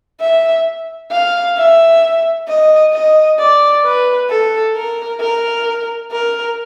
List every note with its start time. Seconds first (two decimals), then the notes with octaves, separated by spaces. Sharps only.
0.21 E5
1.12 F5
1.58 E5
2.48 D#5
2.93 D#5
3.39 D5
3.85 B4
4.30 A4
4.76 A#4
5.21 A#4
6.12 A#4